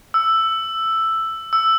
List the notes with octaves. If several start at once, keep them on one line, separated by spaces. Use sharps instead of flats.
E6
E6